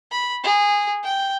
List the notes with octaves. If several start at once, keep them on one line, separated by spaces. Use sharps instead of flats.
B5
G#4
G5